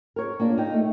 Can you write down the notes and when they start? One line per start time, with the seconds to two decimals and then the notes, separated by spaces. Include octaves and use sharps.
0.16 A#4 C#5
0.39 A#3 D4 F4
0.58 D#4 G5
0.73 A3